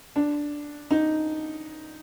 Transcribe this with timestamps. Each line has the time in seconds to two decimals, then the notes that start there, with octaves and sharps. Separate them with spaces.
0.16 D4
0.91 D#4